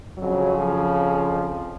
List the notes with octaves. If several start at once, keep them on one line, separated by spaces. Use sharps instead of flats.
F2 C#3 F#3
F3